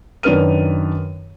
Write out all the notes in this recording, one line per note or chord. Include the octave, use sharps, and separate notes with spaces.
F#2 D#3 D4 B4 F6 D#7